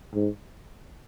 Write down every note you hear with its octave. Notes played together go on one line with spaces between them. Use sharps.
G#2